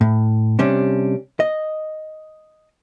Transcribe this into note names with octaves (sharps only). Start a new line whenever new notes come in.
A2
C3 G3 C#4 D4
D#5